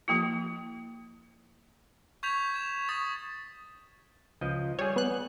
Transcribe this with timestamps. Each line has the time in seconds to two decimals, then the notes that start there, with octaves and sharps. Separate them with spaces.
0.08 F3 A#3 E4
2.23 C#6 G6 G#6 B6 F7
2.54 G#6 E7
2.89 C#6 D#6 A6
4.41 C#2 F3 D#5
4.79 G3 G#4 C#5
4.96 B3 F#6